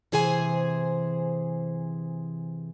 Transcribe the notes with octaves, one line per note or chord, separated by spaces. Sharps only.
C3 E3 G#4 C5 G#5